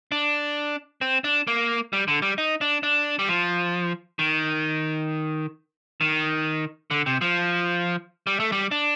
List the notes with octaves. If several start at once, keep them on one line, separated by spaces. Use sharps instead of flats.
D4
C4
D4
A#3
G3
D3
G3
D#4
D4
D4
G3
F3
D#3
D#3
D3
C3
F3
G3
A3
G3
D4